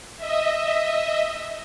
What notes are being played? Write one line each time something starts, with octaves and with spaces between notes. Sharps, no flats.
D#5 E5